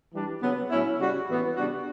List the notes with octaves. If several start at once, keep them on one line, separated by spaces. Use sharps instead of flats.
E3 G3 D4
C#3 F#3 B3
A2 F#3 C#4 E4
C#3 G3 C#4 F#4
A2 E3 B3
C#3 G3 D4 F#4